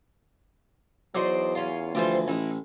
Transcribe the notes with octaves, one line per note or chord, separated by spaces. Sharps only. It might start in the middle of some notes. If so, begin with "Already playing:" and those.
E2 F#3 D#4 C5 D5
C#4 F4
D2 E3 F3 G3 F4 C5
A1 D#4 E4